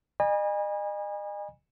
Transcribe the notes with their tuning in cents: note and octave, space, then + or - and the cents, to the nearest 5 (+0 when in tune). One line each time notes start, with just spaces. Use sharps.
D#5 -40 G#5 -30 B5 -40